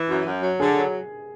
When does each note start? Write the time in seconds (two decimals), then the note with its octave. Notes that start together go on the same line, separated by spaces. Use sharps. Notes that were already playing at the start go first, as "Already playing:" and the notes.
Already playing: E3
0.08 F#2
0.25 F#2
0.42 F#3
0.60 D3 G#4
0.76 F#3